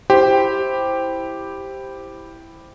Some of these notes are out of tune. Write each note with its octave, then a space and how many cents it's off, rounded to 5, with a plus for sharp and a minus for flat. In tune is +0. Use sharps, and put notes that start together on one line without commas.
E4 +0 G4 +0 C5 +0